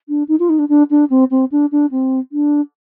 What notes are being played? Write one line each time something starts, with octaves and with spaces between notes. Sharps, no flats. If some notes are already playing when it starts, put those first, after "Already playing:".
D4
D#4
F4
D#4
D4
D4
D4
C4
C4
D4
D4
C4
D4